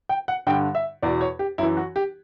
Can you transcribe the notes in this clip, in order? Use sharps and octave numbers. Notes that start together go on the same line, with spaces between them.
G5
F#5
G2 D3 G5
E5
E2 B2 D5
C#5
G4
F#2 E3 E4
F#4
G4